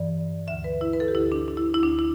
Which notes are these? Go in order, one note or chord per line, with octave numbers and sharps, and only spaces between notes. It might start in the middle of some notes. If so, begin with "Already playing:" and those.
Already playing: G2 E3 D5
D2 D3 E5
B4
E4
B4
A4
G4
D2 D3 E4
D4
D4
E4
E4
D2 D3 D4
E4